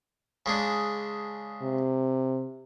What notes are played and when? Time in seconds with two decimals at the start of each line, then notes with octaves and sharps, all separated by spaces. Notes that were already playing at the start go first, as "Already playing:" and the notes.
0.46 C#3 G#3 D4
1.62 C3